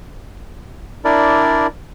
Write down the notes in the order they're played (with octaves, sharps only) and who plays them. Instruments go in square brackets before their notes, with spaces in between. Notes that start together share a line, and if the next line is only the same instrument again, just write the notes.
[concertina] D4 E4 A#4 D5